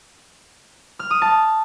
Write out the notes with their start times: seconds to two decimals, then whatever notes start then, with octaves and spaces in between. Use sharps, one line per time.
0.99 F6
1.11 D#6
1.22 A5